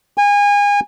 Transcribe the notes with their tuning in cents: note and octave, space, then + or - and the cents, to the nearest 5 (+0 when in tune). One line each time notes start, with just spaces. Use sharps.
G#5 -30